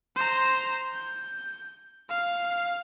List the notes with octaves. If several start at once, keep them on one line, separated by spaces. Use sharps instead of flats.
C5 A#5
G6
F5